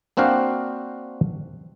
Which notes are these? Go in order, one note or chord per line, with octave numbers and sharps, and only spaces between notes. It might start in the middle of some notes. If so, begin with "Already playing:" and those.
A#3 C4 D4 F#4 F5 G5